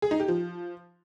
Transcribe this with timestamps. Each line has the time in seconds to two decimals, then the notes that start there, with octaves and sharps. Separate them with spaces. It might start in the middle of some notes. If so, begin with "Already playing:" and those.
0.02 G#4
0.11 D#4
0.20 G4
0.28 F3